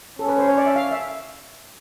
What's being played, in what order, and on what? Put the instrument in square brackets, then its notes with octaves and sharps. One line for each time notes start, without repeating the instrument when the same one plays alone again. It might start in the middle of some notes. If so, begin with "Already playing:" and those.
[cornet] C#4 [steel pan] A4
[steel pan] B4
C5
C#5
D5
E5
F5
E5